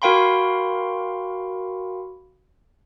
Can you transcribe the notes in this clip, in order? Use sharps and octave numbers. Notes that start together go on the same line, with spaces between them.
F#4 A#4 F5 G5 B5 C6